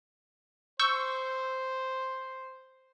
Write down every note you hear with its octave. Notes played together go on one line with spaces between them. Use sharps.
C5 C#6 E6 G6